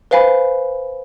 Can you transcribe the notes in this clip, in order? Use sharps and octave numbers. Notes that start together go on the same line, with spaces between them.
B4 C5 F5 G#5 B5